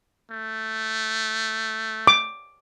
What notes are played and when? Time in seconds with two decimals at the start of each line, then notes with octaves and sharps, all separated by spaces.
0.31 A3
2.07 D6